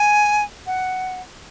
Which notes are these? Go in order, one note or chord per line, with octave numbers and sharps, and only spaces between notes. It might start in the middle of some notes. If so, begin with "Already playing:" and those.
Already playing: G#5
F#5